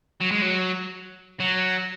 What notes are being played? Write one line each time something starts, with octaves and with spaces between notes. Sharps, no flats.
F#3
G#3
F#3
F#3